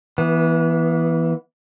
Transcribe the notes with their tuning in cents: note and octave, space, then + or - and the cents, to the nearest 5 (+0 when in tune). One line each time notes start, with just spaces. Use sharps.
E3 +0 B3 -30